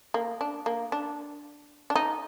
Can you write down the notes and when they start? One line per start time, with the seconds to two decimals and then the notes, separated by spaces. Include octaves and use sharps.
0.14 A#3
0.41 D4
0.66 A#3
0.92 D4
1.90 D4
1.96 D#4